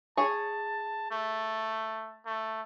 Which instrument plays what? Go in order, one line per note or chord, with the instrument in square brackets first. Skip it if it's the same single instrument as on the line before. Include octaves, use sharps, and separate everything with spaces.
[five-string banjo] G#4 C#5 [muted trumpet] A5
[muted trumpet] A3
A3